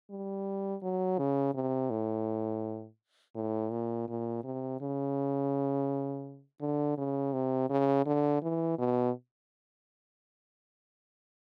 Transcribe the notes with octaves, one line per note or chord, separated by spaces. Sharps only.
G3
F#3
C#3
C3
A2
A2
A#2
A#2
C3
C#3
D3
C#3
C3
C#3
D3
E3
B2